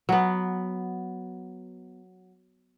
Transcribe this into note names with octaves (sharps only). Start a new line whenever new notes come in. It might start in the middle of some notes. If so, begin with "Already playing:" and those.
F#3 B3